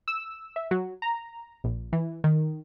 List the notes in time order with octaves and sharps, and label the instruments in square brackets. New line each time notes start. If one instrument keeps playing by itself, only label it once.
[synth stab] E6
E5
F#3
A#5
A#1
E3
D#3